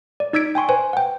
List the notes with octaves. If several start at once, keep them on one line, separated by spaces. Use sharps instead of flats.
D5
D#4 D5 E6 G#6 B6 D7
G5 G#5 C6 C#6
B4 C5 G#5
F#5 G5